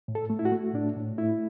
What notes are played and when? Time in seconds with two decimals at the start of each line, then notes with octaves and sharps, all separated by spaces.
0.08 A2
0.15 A4
0.30 A3
0.39 E4
0.45 F#4
0.52 A3
0.74 A2 D4
0.96 A2
1.18 A3 E4